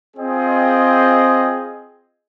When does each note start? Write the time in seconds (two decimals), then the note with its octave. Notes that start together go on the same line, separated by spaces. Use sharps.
0.15 C4 F4 G#4 D#5 G5